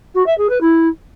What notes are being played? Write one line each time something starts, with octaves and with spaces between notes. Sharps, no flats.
F#4
E5
G#4
B4
E4